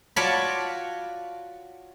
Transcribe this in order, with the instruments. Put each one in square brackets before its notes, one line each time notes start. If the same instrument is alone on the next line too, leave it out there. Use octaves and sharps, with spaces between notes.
[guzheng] F4 F#4 C#5 D5 A5 B5